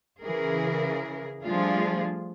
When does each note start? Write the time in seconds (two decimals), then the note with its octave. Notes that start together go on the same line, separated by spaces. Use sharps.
0.22 C#3 E3 G#4 A#4
1.43 F3 G3 A3 D4 F4 G#4